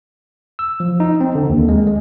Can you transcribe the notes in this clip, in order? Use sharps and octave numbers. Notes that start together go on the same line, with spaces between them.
E6
F3
D#4
C4
D3
D#2
G#3
G#3